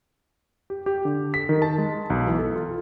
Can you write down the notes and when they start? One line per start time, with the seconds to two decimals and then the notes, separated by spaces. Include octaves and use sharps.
0.70 G4
0.86 G4
1.05 D3
1.34 B6
1.49 D#3
1.62 A5
1.78 G#3
2.10 B1
2.27 E3
2.39 A4
2.56 F4